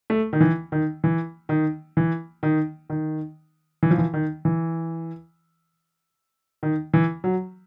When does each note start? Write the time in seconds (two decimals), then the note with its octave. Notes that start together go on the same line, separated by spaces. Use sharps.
0.10 A3
0.33 D#3
0.40 E3
0.72 D#3
1.04 E3
1.49 D#3
1.97 E3
2.43 D#3
2.90 D#3
3.83 E3
3.91 F3
3.98 E3
4.14 D#3
4.45 E3
6.63 D#3
6.94 E3
7.24 F#3